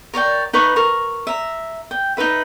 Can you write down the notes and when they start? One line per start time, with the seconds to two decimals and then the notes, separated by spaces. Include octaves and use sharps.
0.14 A#4 C#5 D5 G5
0.53 D#4 B4 B5 C#6
0.76 A#4 C#6
1.27 E5 A#5
1.91 G5
2.17 D#4 A#4 B4 E5